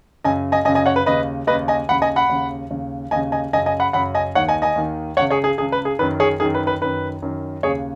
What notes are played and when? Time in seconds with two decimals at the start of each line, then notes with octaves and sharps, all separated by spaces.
0.24 F#2 C#3 D#5 G#5
0.52 D#5 G#5
0.65 F#2 D#5 G#5
0.68 C#3
0.75 D#5 G#5
0.86 C#5 F#5
0.96 B4
1.06 D#2 C#3 B4 D#5
1.47 D#2 B4 D#5
1.52 C#3
1.68 D#5 G#5
1.88 D#2 C#3 F#5 B5
2.02 D#5 G#5
2.16 F#5 B5
2.29 D#2 C#3
2.70 D#2 C#3
3.11 D#2 D#5 G#5
3.16 C#3
3.32 D#5 G#5
3.53 F#2 C#3 D#5 G#5
3.66 D#5 G#5
3.80 F#5 B5
3.93 F#2 C#3 F#5 B5
4.15 D#5 G#5
4.35 D#2 D#3 C#5 F#5
4.49 D#5 G#5
4.62 D#5 G#5
4.76 D#2 D#3
5.16 C#2 C#5 F#5
5.21 C#3
5.30 G#4 C#5
5.44 G#4
5.58 C#2 C#3 G#4
5.72 B4
5.85 G#4
5.99 F#2 D#3 B4
6.20 G#4 C#5
6.40 F#2 D#3 G#4
6.54 B4
6.67 B4
6.81 F#2 D#3 B4
7.22 F#2 D#3
7.63 D#2 C#3 G#4 C#5